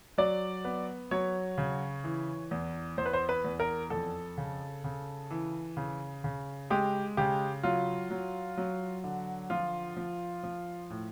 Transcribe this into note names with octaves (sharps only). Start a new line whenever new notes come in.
F#3 D5
B3
F#3 C#5
C#3
E3
E2
E2 C5
B4
C5
B4
E2
A#4
F2 A4
C#3
C#3
E3
C#3
C#3
G#3 G4
C#3 G4
F#3 F4
F#3
F#3
D3
F3 F4
F3
F3
A2